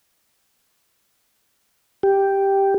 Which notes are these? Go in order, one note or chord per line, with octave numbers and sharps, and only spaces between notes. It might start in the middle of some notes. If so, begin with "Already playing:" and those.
G4